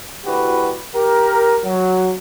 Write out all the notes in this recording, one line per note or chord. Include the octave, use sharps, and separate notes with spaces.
D2 E4 F#4 G4 B4
G4 A#4
F#3